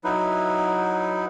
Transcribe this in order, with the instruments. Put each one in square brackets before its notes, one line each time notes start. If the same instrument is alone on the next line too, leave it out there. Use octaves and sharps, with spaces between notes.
[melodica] F#3 D#4 E4 B4